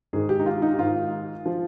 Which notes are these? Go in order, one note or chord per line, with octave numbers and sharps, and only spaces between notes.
G#2 D#3 G#4
G4
D#4
F4
D#4
G4
G#2 D#3 F4
F3